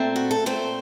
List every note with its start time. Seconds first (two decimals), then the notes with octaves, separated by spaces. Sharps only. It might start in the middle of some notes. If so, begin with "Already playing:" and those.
Already playing: A#2 A3 C4
0.16 F#4
0.31 A4
0.46 A#2 A3 C4 C5